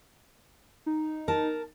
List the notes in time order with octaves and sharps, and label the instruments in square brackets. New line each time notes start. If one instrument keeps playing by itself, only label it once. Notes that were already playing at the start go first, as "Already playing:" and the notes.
[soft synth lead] D#4
[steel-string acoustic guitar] A#4 A5